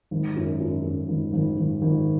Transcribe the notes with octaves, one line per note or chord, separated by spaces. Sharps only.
G#1
F#2
F#2
F#2
G#1
G#1
G#1
G#1